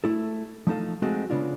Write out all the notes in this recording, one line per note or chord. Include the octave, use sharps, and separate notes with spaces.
A3 E4 A4
F3 A3 D#4 A4 F5
G#3 A3 C4 D#4 F#4 A4
C#3 B3 D4 F4